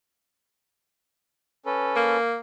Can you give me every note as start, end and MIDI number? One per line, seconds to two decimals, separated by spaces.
1.66 2.17 61
1.66 2.17 69
1.66 2.17 71
1.96 2.38 58